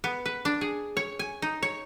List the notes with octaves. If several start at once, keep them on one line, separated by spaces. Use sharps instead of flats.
B3
B4
D4
G#4
C#5
G#5
D#4
C#5